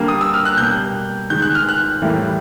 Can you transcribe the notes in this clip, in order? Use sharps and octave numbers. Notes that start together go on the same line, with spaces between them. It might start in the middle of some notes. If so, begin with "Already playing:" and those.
Already playing: D3 G3 A#3
D#6
E6
F6
F#6
B2 G3 A#3 G6
D#3 G#3 G6
F#6
F6
F#6
A2 E3 G3 A#3